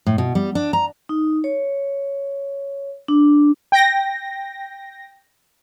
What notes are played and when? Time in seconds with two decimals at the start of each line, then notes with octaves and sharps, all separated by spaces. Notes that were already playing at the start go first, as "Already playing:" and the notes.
0.06 A2
0.18 B2
0.35 G3
0.55 D4
0.73 A#5
1.09 D#4
1.44 C#5
3.08 D4
3.72 G5 A#6